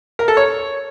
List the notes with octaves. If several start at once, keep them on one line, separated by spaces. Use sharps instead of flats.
A#4
A4
C#5